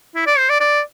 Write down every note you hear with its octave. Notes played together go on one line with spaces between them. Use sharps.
E4
D5
C5
D5
D5